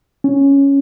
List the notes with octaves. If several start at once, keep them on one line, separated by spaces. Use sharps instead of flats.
C#4